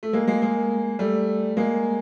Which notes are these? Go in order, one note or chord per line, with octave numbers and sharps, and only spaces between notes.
A3
G#3 A#3
G#3 A#3
G#3 A#3
G3 A3
G#3 A#3